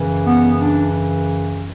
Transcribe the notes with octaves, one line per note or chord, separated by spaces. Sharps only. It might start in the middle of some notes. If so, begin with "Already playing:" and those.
Already playing: F#2 C#3 E3
B3
D4